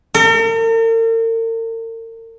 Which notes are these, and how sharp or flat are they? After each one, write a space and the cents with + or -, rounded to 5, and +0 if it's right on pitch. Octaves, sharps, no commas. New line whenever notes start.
A#4 -45